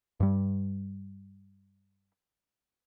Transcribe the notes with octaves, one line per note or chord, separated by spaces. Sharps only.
G2 G3